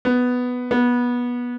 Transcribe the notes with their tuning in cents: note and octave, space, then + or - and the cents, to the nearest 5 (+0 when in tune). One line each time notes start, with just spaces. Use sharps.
B3 +5
B3 -20